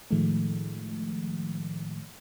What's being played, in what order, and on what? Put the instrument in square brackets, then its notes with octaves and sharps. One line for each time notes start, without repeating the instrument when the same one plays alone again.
[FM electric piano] A2 D#3 F3 G#3 A3